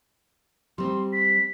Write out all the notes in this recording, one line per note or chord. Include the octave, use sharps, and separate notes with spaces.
G3 C4 C6
B6